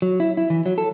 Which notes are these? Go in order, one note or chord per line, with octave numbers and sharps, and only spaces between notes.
F#3
E4
E4
E3
F#3
A4